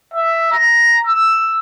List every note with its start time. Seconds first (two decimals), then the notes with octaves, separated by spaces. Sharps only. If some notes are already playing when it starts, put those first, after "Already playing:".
0.14 E5
0.52 A#5
1.07 E6